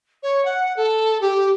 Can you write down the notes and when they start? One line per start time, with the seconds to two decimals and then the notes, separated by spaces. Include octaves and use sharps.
0.22 C#5
0.45 F#5
0.76 A4
1.21 G4